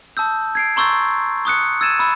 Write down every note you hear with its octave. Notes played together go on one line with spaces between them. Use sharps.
A5 D#6 E6 G6
G#6 C7 D7
A#5 C6 C#6 E6 G6 A6
C#6 D#6 F#6 C#7
E6 G#6 A6 D#7 E7
B5 E6